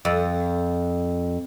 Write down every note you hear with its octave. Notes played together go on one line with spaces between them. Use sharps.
F2